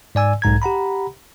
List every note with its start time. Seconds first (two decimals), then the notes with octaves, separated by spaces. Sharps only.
0.15 G#2 D5 G#5 E6
0.42 B1 G#2 A#5 G#6
0.62 G4 F#5 A#5 B5